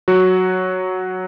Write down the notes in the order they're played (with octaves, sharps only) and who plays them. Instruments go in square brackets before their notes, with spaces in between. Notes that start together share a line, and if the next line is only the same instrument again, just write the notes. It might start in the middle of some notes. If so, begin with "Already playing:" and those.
[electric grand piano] F#3 F#4